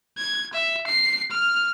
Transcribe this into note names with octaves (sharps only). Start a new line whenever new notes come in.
G#6
E5
C7
F6